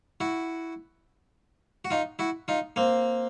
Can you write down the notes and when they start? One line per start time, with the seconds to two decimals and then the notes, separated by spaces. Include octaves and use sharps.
0.20 E4 F#4
1.85 F#4
1.91 D#4 F4
2.19 E4 F#4
2.48 D#4 F4
2.76 A#3 C4